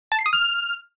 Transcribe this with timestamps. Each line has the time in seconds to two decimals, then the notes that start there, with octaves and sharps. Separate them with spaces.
0.12 A5
0.19 C7
0.26 D#6
0.33 F6